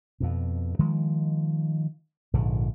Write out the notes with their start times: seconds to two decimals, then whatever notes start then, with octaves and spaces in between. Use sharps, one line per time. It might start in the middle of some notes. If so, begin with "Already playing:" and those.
0.20 F2 B2
0.79 D#3 F3 G#3
2.33 A#1 G#2 D3